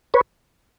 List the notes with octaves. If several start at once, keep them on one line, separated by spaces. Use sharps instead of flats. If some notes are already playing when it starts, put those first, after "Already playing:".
B4 C#5